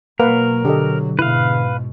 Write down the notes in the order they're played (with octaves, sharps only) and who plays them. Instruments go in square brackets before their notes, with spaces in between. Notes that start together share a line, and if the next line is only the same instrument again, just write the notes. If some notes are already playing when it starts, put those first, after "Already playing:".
[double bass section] B2 F#3 [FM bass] A#3 [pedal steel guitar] A#4 [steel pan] B4 F5 F#5
[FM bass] D3 [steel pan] G4 A4 D#5
[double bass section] G#2 B2 [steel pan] E4 [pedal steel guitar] B4 F5